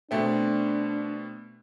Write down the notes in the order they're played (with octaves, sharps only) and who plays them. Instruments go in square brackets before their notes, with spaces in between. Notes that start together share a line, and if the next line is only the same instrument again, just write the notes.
[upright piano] B2 A3 C4 [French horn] D4